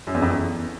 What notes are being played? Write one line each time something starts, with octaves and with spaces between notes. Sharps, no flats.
F#2
E2
F2
E2